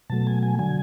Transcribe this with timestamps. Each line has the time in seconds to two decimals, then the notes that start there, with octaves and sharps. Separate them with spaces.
0.10 B2 F#3 A3 A5
0.27 G#5
0.43 G#5
0.59 D3 F#3 G#5